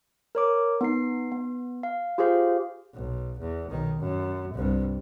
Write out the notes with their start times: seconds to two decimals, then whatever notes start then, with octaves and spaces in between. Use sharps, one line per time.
0.35 A#4 C#5 D6
0.81 B3 D#4 C7
1.32 B3
1.83 F5
2.18 F4 G4 G#4 C5 F5
2.94 B1
3.40 E2
3.71 B1 D#3
3.99 F#2
4.54 C2 G2